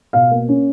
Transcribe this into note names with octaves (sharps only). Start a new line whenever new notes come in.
B2 F5
A#3
C#4